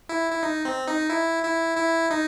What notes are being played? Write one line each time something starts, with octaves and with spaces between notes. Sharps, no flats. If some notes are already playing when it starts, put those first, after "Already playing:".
E4
E4
D#4
C4
D#4
E4
E4
E4
D#4